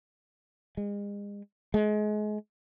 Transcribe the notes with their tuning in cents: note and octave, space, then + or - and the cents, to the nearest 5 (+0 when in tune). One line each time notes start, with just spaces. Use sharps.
G#3 -40
G#3 +30